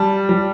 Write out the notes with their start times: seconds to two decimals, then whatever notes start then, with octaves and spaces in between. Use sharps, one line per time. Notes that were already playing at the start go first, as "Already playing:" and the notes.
Already playing: G3 A5
0.29 G3